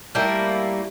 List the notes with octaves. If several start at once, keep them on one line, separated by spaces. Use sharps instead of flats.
G3 A3 A#3 E4